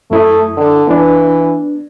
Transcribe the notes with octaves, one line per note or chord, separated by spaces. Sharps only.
F#2 A3 E4 D#6
D3
E3 B3 D4